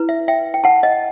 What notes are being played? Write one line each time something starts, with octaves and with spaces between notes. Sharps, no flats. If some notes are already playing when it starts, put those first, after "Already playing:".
Already playing: E4 B4
E5
E5 G5
G5
F#5 A5
D#5